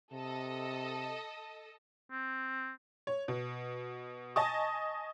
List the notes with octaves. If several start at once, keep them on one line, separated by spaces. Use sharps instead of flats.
C3 A4 D#5
C4
C#5
B2
D#5 G#5 A5 C#6 D#6